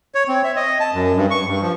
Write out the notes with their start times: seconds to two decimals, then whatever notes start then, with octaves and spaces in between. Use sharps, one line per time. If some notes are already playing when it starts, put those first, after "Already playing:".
0.15 C#5
0.28 C4
0.44 E5
0.56 D#5
0.80 A5
0.94 F#2
1.16 G2
1.31 C#6
1.47 G2
1.62 F3